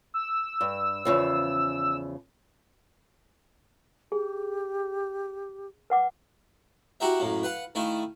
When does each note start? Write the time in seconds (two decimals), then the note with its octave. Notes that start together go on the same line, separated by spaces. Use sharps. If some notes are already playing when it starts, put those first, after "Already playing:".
0.14 E6
0.61 G2
1.05 E2 C#3 F3
4.12 G4 G#4
5.90 B4 F#5 D6
7.00 E4 F#4 G4 A#4 E5
7.20 F#2 A2 A#3
7.43 B4 F5 F#5
7.75 D#3 A3 E4 F5